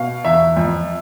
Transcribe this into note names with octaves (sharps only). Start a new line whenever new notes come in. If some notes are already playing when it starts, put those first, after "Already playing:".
Already playing: B2 F5
E2 E5
F2